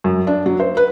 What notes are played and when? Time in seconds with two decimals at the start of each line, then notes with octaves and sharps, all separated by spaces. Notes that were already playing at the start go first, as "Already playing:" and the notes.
0.04 F#2
0.27 D4
0.46 F#3
0.60 C5
0.77 B4